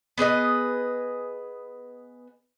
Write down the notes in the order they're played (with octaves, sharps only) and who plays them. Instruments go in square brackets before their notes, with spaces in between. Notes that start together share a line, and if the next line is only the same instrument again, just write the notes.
[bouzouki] B3 G#4 B4 D#5